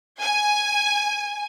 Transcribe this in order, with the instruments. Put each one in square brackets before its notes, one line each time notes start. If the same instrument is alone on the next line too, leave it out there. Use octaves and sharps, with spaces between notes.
[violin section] G#5